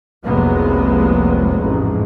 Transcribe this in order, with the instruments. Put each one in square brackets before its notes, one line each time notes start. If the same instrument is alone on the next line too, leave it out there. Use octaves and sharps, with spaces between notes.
[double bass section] F1 C2 F#3 G#3 A#3 B3
A1 F2 G#2